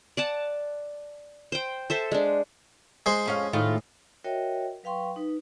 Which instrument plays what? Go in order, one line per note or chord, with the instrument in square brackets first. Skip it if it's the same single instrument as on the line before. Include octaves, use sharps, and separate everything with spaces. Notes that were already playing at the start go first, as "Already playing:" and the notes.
[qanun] D5 F#5 A5
C5 G5
A4 C5 E5
G#3 D4
[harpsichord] G#3 C5
[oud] F2 C#4 F5
A2 D#3 F4
[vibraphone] F#4 A#4 C#5 D#5 E5 G5
F#3 B4 F5 G5 C6 C#6
D#4 B4